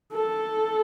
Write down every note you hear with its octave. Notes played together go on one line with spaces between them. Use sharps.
A4